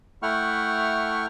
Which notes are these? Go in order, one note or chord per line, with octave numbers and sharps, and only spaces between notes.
A3 E4 F#5 G5 C#6 F6